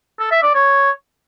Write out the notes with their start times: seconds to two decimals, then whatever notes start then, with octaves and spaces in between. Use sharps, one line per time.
0.20 A4
0.31 E5
0.43 D5
0.54 C#5